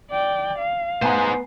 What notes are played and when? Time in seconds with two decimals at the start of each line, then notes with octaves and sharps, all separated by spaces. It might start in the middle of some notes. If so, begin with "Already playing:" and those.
0.11 D5 G5
0.59 F5
1.02 B3 D#4 C5 F#5 G#5 A#5